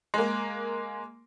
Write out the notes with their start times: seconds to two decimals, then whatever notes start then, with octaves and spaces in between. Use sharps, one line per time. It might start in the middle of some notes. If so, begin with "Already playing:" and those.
0.14 G#3 A#3